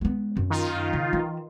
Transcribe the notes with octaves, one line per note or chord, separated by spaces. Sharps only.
G#3 B3
F#2
D#3 D#4 F4
C#3
E3